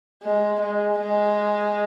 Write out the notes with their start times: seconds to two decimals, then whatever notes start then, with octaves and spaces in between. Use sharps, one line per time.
0.23 G#3
0.61 G#3
0.99 G#3